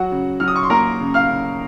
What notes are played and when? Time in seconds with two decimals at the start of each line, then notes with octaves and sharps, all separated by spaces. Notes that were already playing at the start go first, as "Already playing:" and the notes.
Already playing: F#3 F#4 F#5
0.12 C#3
0.40 F#3 F6
0.48 D#6
0.56 C#6
0.63 C6
0.70 A#3 A#4 A#5
1.00 C#3
1.14 F5 F6
1.29 C#3